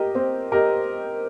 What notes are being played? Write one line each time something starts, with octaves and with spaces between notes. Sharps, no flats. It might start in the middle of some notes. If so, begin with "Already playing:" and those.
Already playing: G4 A#4 D#5
C4
G4 A#4 D#5